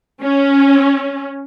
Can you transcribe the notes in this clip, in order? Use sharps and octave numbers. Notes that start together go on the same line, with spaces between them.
C#4